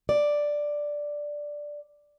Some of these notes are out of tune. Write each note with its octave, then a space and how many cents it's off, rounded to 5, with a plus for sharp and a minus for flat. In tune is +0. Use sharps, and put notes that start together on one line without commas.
D5 +0